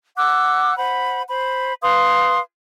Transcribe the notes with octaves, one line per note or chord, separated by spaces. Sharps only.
F#5 D6 E6 F#6
C5 F#5 B5
C5 B5
B4 F5 C6 D#6